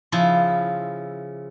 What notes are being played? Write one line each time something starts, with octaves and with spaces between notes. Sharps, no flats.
C#3 F3 E4